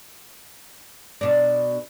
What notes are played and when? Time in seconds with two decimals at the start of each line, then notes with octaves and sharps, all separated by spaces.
1.21 B2 D4